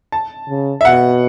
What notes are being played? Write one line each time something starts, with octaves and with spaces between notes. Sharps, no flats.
A5
C#3
E5
B2 F#5